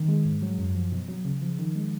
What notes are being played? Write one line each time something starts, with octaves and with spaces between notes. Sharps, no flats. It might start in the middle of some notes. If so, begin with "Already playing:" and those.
Already playing: D#3
G#3
G#2
F#3
F#2
F3
B2
F#3
C#3
F3
D#3
G#3